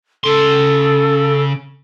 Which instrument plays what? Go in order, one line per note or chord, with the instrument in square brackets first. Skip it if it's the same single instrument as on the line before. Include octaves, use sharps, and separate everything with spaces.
[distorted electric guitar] C#3 C6 [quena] A4